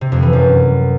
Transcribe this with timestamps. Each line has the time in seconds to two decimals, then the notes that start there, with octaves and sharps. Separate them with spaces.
0.01 C3
0.12 F2
0.22 E3
0.33 F#2